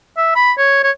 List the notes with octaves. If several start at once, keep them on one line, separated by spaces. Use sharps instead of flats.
E5
B5
C#5
C#5